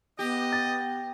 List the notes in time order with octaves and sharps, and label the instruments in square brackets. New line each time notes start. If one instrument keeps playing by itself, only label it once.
[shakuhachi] B3 [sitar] G4 [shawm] D#5
[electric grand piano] A6